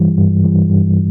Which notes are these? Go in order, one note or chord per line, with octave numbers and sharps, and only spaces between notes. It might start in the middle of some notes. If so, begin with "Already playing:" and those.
Already playing: G2 E3 G3
G2
E3 G3
G2